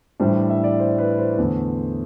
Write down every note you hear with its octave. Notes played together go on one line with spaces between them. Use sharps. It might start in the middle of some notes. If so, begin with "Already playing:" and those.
A2 E3 G3 D4 C5
E5
D5
C5
B4
C5
E2 D3 A3